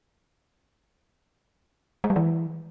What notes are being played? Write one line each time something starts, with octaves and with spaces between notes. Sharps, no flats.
G#3
G3
E3